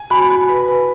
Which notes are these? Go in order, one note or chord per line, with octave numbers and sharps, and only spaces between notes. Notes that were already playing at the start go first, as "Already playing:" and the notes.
Already playing: G#5
F#4 B5
F#4
B4
B4